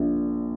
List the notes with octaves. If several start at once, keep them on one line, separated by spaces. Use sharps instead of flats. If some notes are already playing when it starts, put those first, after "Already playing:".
Already playing: A#1 A#2